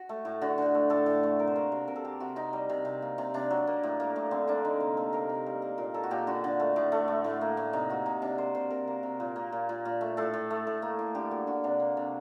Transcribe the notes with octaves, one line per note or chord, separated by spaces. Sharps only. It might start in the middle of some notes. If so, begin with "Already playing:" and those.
Already playing: F#4
A3
A2
D3 F#4
D3
A3
A2 A4
A2
A3
C3 A#4
C5
A#3 A#4
C3
C3 A#4
A4
A#3 G4
C3 F#4
C3 D#4
G3
C3
C3
A#3
C3
C3 D4
F#3
A#3
A2
A#3
A2
D3 C4
A#3 D4
D3 D#4
C3
A#3 A4
C3 A#4
C3
G3
A#3
A#2 A#4
A#3 A4
F#4
A#2 G4
D3 F#4
D3
A3
A2
A3
A2
A2
A#3
A2
C3 D#4
A#3 F#4
C3 D#4
C3 D4
A#3 C5
C3 C5
C3 A#4
A#3
C3
A#2
A#3
A#2
A#2
A#2
A3
A2 A4
A2
A3
A2
A#3
A2
D3 G4
A#3 F#4
D3 F#4
C3 D4
A#3
C3